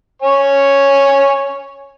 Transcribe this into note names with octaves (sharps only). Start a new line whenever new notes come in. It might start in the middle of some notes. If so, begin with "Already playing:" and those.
C#5 G#5 C#6